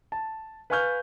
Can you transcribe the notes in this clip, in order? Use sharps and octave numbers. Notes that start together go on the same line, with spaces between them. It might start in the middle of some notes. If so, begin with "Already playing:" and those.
A5
B4 F5 G#5 C#6 F6 G6